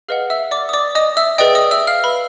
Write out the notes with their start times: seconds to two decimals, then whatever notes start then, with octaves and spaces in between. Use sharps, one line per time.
0.08 G#4 B4 D#5 F5 F#5 F6
0.30 E5 E6
0.51 D5 D6
0.69 D#6
0.73 D5 D6
0.95 D#5 D#6
1.17 E5 E6
1.38 G#4 B4 D5 D#5 G5 D#6
1.55 D#5 D#6
1.71 E5 E6
1.87 F5 F6
2.04 B4 B5